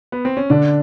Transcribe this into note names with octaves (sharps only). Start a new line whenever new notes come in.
B3
C4
C#4
D3 D4